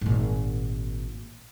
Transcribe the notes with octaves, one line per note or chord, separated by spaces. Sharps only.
G#1 A#2